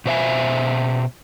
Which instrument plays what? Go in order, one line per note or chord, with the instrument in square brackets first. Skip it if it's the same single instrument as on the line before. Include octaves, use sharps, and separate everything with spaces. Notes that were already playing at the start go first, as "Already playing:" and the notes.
[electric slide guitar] B2 C5 E5 G#5